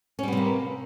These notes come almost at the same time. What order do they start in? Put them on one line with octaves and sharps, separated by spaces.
C#4 G3 B3 C3 A#3